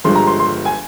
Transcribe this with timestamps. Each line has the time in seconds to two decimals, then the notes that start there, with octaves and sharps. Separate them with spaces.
0.04 G1 G2 F3 G#3 C6
0.15 A#5
0.27 C6
0.39 C6
0.65 G#5